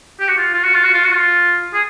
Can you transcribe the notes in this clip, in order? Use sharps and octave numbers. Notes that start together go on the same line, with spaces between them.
G4
F#4
F4
F4
F#4
F4
F#4
F4
F#4
F4
G#4